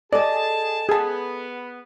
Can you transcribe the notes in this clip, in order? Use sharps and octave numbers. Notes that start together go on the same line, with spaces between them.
G#4 A4 D5 D#5 A5
B3 G#4 A5